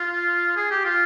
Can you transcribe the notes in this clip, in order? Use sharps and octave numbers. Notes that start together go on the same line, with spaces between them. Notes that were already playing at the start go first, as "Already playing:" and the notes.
Already playing: F4
G#4
G4
F4